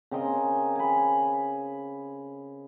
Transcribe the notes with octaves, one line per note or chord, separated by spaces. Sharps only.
C#3 C4 A#4 D#5
G#5 B5